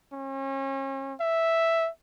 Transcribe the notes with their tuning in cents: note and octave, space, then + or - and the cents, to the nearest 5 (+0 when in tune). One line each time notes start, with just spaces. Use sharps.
C#4 -35
E5 +0